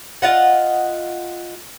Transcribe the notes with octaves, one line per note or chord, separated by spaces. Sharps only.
F4 D#5 F#5